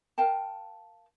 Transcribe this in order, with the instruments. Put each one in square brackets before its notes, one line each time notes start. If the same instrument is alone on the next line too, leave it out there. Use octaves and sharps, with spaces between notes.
[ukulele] A#4 F5 G5 A5